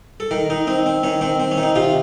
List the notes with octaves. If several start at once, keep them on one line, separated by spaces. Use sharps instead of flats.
A4
D#3 A#4
D#3 D#4
C4 D#4
C4
D#3 C#4
D#3 C4
C4
C#4
D#3
D#4
C3 F4